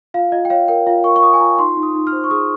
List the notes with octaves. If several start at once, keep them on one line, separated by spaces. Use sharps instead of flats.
F4 F5
F4 D#5
G5
C#5 F5
A#4 G5
F4 F5
A#4 C#6
C#6
F4 D#6
G#5
F4 A#5
D#4 C6
D#4
D#6
D#4
F6
C5
C#6
G#4 D#6